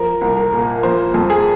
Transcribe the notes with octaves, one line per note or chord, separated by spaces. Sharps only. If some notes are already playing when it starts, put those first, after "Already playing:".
Already playing: F3 A#4
C2
A#4
A#2
F3 C5
F2
G#4